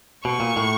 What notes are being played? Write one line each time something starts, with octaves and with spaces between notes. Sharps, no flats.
B2 C#6
A#2
A2